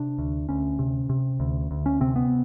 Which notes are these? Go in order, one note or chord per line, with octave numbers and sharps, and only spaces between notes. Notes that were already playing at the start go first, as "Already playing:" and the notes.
Already playing: C3 D4
D2
D2 C#4
C3
C3
D2
D2
C#4
C3 C4
B3